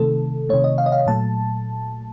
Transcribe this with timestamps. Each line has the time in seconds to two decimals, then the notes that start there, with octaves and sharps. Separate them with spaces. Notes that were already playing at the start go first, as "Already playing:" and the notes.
Already playing: C3 D#3 A3 A4
0.49 C3 D#3 A3 C#5
0.64 D#5
0.78 F5
0.86 D#5
0.92 F5
1.07 A#2 F#3 A3 A5